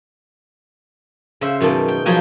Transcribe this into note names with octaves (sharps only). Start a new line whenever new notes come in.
C#3 C5 E5
F#2 B2 D#3 A5
G5
F3 F#3 D#4 F#4 G5 G#5